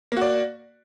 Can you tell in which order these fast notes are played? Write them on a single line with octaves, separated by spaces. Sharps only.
A#3 F#4 D5